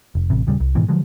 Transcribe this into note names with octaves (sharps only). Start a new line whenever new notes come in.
F1
A1 C3
D#1 C#3 G3
C2
G#2 B2 D#3 E3
D3 F3 F#3 G#3